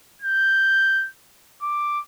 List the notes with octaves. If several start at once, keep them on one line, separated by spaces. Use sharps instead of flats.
G6
D6